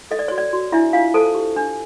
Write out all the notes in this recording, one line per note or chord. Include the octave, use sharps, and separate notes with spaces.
A4 D#5
D5
F#4 C#5
D5
F#4
D4 E4 E5
D4 F4 F5
A4 C5 A5
G4
D4